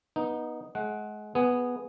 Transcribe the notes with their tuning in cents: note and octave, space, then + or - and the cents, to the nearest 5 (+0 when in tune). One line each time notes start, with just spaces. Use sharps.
B3 -20 D#4 +0
G#3 +30 F#5 +0
B3 +0 G#4 +0